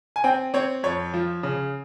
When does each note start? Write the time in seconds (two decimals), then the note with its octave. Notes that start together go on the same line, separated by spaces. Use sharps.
0.16 G#5
0.24 C4 G5
0.54 C4 C#5
0.83 F2 C#5
1.14 F3
1.43 C#3